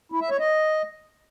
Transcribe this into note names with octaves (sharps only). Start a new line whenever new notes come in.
E4
E5
C#5
D#5